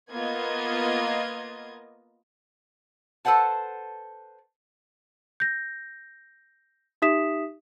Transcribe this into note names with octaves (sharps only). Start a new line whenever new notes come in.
A#3 B3 F4 D#5 G#6
A4 B4 C5 F#5 A5
G6 A#6
D#4 G4 E5 D#6 B6 E7